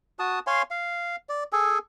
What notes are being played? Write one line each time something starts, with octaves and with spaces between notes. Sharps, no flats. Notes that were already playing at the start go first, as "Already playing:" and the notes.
F#4 A5 D#6
C#5 F5 G#5 C6
F5
D5
G#4 A4 G#5